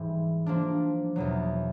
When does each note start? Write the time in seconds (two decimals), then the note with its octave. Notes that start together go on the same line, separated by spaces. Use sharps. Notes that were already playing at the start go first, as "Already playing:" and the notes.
Already playing: G#2 E3 G3
0.46 F3 A#3 D4
1.16 E2 B2 F#3